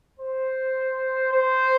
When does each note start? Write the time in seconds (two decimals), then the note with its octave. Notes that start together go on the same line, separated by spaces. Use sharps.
0.19 C5
1.32 C5